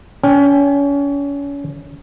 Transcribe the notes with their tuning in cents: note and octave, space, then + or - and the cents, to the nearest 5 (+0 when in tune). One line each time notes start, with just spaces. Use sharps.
C#4 +35 G5 +25